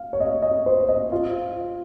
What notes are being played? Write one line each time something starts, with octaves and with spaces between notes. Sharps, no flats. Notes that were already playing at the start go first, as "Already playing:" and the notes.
Already playing: F5
C#5
D#5
D#5
C5
D#5
F4